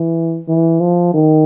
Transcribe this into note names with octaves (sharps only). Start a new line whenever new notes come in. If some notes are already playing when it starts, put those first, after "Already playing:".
Already playing: E3
E3
F3
D#3